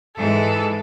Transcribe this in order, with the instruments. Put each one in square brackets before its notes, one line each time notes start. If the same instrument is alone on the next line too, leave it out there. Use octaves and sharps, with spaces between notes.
[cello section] G#2 E3 G#3 [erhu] A4